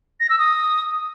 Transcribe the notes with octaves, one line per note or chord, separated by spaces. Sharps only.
A#6
E6
D#6